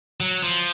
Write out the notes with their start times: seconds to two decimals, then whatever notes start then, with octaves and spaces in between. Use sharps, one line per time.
0.20 F#3
0.43 F3